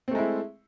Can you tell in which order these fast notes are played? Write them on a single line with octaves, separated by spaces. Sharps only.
C4 A3 G#3 E4